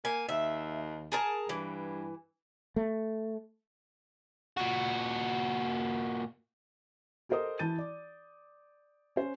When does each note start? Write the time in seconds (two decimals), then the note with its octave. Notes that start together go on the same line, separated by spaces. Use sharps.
0.05 A#3 G#5
0.29 D#2 E5
1.12 G#4 A#4 A5
1.49 G2 E3
2.76 A3
4.57 A#2 F#4
7.29 G4 A4 A#4 C5 D#5 D#6
7.59 E3 E4 A5 G6 A6 D#7
7.78 D5
9.16 C#4 C5